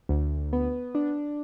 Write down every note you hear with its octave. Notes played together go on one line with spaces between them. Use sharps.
D2
B3
D4